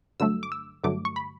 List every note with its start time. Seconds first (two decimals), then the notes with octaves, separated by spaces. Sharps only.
0.20 G2 D3 F#3 A3 E6
0.43 D6
0.52 E6
0.84 G2 D3 F#3 A3 D6
1.05 C#6
1.16 B5